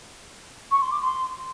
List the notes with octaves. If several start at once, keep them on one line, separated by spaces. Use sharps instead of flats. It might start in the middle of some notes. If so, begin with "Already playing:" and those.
C#6
C6
D6
C6